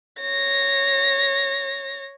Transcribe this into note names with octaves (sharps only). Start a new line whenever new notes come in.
C#5 A#6